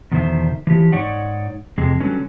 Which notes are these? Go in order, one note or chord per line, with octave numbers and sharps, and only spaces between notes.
E2 B2 D3 D#3 C5 E5
E3 F3 G4
G#2 D#4 C#5 D5 F#5
F2 C3 G#3
D3 F#3 G3 C#4 B4